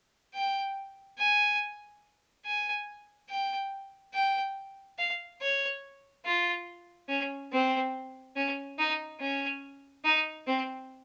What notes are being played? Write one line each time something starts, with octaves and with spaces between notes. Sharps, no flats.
G5
G#5
G#5
G5
G5
F5
C#5
F4
C#4
C4
C#4
D#4
C#4
D#4
C4